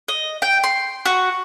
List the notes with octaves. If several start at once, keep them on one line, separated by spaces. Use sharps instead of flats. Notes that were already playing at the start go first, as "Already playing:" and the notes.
D#5
G5
C6
F#4